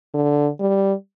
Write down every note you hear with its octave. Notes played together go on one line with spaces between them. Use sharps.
D3
G3